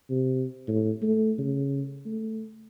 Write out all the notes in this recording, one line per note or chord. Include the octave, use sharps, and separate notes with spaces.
C3
A2
A3
C#3
A3